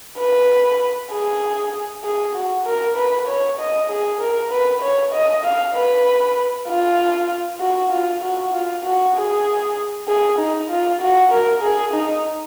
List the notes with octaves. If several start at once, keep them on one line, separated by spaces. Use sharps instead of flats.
B4
G#4
G#4
F#4
A#4
B4
C#5
D#5
G#4
A#4
B4
C#5
D#5
F5
B4
F4
F#4
F4
F#4
F4
F#4
G#4
G#4
D#4
F4
F#4
A#4
G#4
D#4